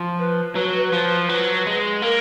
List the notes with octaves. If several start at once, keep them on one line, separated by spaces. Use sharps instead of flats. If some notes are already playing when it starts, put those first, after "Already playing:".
Already playing: F3
B4
F#3 B4
B4
F3
F#3
G#3
A#3 A#4